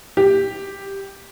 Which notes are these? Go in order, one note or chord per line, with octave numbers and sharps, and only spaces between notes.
G4